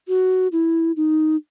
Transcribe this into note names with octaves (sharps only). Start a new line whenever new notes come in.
F#4
E4
D#4